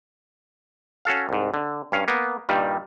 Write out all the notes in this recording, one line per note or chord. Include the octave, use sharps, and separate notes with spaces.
C#4 F#4 A4 F5
C2 G#2
D3
G2 C#4 F5
A#3 B3
G2 A#2 D#3 G3